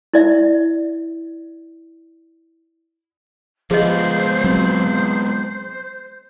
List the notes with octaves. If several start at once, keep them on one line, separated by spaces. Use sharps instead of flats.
E4 D5 E5
F3 G#3 B3 F4 G#4 C5 D#5
F#3 C4